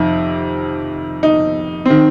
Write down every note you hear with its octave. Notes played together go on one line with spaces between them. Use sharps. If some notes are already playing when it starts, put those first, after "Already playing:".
Already playing: F2 C3 D#3
D#4
D#3 C4